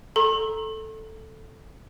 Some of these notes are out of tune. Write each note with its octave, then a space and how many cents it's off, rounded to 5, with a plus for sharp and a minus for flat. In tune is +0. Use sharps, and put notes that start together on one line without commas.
A4 +0 A#5 +5 C#6 -45